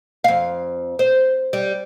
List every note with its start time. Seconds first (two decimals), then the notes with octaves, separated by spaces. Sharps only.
0.24 F2 F5
0.99 C5
1.53 G3